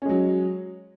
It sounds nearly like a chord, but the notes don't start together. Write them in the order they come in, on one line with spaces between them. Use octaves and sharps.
C#4 G#3 F#3